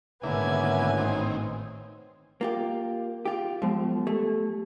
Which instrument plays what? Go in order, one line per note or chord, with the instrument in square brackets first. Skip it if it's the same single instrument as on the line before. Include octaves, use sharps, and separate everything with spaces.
[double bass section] G#1 A2 [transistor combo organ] D3 A#3 E4 [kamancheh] B3 G#5 [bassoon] C#4
[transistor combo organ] D#3 C4
[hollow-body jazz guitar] A#3 F4 G4
F4 G4
[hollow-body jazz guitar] F3 [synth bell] F#3 G#3 B3
[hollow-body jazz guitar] A3 [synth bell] G4